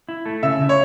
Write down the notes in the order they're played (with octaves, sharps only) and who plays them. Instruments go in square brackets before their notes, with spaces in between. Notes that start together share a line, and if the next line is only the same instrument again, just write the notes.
[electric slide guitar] E4
A3
[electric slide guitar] C#3 [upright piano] E5
[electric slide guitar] C#3
[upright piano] C#5